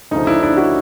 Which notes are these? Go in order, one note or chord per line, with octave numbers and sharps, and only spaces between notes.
D2 C#3 F3 D#4
D4 E4
D4 E4
E4 F#4